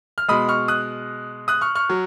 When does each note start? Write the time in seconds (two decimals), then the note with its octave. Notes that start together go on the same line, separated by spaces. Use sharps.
0.18 F6
0.28 B2 G#3 B5 D#6
0.49 C#6 F6
0.68 D#6 F#6
1.48 D#6 F#6
1.61 C#6 F6
1.75 C#6 F6
1.90 F#3